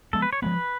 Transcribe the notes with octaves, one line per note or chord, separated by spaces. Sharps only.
F3 G#3 B3 A4
B4
C#5
F3 G#3 B3 B4